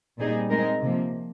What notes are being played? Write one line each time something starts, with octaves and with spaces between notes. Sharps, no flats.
A#2 G3 C4 D#4 G#4
G#3 C4 D#4 A#4
C3 F3 A#3